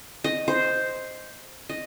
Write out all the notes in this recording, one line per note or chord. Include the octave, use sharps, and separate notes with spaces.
D#5
C5
D#5